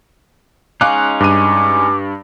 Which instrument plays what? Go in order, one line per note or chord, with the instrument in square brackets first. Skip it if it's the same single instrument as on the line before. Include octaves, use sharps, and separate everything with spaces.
[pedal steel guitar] G#3 C#4 D#4 [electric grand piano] F5 D6 F#6
[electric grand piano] G2 D#7 [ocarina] D6